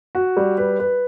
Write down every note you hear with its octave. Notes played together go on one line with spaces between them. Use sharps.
F#4
G3
B4
B4